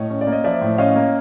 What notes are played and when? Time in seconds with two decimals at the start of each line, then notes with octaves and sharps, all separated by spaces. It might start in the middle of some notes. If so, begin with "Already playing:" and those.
Already playing: A2 C#5 D#5
0.10 C#4
0.21 D5
0.27 A#3
0.32 D#5
0.44 F3 D5 E5
0.61 A2
0.78 C#4 D#5 F5
0.96 A#3